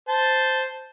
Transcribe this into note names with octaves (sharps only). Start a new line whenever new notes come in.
C5 A5